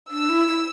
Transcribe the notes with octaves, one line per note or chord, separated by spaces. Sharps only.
D4 E6
E4
E4